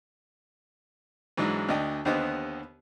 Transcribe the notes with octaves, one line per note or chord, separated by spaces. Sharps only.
G#2 E3 F#3 G#3 D4
D2 D4 D#5 G5
D#2 D3 B3 G4 C5 D#5